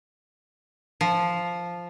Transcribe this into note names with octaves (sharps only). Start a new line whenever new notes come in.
F3